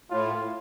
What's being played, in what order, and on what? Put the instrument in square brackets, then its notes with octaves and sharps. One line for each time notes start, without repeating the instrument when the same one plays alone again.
[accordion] A2 [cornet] F4